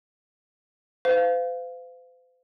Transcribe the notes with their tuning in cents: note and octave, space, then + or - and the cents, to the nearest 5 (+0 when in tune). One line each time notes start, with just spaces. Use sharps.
C5 -45 F5 +0